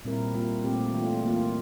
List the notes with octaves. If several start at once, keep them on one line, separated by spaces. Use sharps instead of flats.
A#2 G3 C4 E4 A#4
G3 A#3 F4
A#2 A3 C4 G4
E3 A3 D4 F4
E3 A#3 F4